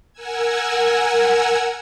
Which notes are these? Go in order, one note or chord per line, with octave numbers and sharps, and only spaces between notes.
A#4 F#5 G#5 E6 G#6